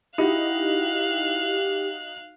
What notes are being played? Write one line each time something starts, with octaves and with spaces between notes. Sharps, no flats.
D#4 E4 F#4 G4 F5 F#6